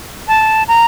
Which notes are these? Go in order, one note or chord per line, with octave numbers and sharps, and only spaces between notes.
A5
A#5